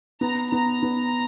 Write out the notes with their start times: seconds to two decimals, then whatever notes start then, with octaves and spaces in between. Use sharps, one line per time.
0.21 B3 A#5
0.52 B3 A#5
0.83 B3